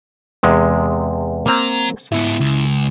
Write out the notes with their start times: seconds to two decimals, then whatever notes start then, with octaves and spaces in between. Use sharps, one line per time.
0.43 E2 C3 G#3
1.46 F#3 A#3 C4 A#5
2.12 G#2 B3 E4
2.40 C#2